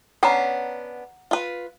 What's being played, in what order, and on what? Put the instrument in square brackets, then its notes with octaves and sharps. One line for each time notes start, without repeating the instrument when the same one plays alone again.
[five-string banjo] B3 C#4 D4 [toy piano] F#5 A#5
[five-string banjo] F4 B4